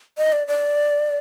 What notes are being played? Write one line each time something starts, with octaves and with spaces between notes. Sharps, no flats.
D#5
D5
D5